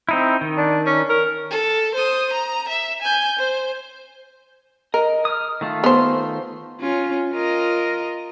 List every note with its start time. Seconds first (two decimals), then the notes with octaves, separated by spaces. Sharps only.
0.09 C4 D#4 E4
0.41 D#3
0.57 D4
0.86 C#4
1.10 A#4
1.51 A4
1.94 C5 D#6
2.32 A#5
2.68 E5
3.01 G#5 G6
3.38 C5
4.94 A#4 D#5
5.25 D#6 F6
5.61 D#3 A3 F4
5.84 B3 C5
6.81 C#4 F4
7.33 F4 A#4 D#5